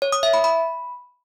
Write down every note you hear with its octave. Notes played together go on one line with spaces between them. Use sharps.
C#5
D#6
E5
B5
B5